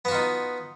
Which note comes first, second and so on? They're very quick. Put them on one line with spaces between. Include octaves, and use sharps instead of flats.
B3 F#4 F4 D#4